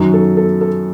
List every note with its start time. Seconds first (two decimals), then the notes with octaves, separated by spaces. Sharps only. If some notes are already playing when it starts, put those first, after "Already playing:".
Already playing: F#2 D#3 F#3
0.13 A4
0.37 A4
0.61 A4